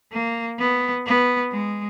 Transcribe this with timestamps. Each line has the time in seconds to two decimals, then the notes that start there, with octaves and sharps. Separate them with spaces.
0.12 A#3
0.59 B3
1.06 B3
1.52 G#3